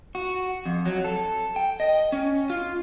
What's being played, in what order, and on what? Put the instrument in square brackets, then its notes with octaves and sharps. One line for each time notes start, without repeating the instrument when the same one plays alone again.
[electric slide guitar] F#4
F2
F#3
A4
G5
D#5
C#4
F4